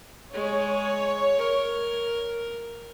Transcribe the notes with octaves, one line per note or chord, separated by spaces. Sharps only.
G#3 C#5
A#4